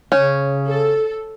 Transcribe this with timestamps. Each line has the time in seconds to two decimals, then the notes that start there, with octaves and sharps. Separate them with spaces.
0.12 C#3 C#4 C#5
0.67 A4